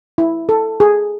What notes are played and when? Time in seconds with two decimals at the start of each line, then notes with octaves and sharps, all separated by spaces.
0.18 E4
0.49 A4
0.80 G#4